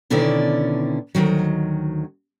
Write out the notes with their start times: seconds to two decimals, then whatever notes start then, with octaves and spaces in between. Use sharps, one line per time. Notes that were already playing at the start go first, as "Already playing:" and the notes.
0.10 B2 D3 D#3 C#4 E4 D5
1.15 D2 G#2 D#3 F#3